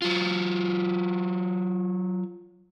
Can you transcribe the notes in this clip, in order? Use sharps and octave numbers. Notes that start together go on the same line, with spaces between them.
F#3 F4